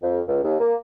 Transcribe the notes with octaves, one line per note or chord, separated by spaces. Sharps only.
F2
C#2
D#2
A#3